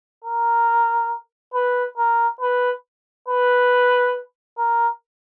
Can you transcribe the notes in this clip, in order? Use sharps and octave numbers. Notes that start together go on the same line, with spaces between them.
A#4
B4
A#4
B4
B4
A#4